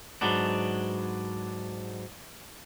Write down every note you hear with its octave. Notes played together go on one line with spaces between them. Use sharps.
G#2 F#3 B3 D4